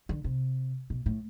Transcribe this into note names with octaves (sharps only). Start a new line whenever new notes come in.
D3
C3
B2
A2